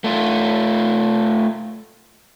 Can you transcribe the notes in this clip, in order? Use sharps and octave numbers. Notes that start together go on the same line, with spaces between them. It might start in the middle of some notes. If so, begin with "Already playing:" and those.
A3 F4